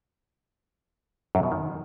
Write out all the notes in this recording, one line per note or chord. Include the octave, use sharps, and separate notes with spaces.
F#2
B2
D#3